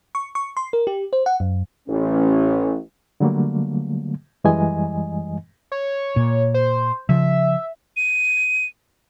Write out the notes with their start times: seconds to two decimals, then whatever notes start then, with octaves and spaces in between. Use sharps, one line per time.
0.15 C#6
0.35 C#6
0.57 C6
0.73 A#4
0.87 G4
1.13 C5
1.26 F#5
1.40 F#2
1.88 A1 C#4
3.20 D3 F#3 G3 A3 A#3
4.44 F#2 E3 G3 G#3 D#5 G#5
5.72 C#5
6.16 A#2
6.54 C5
7.09 C#3 F3 E5
7.97 D#7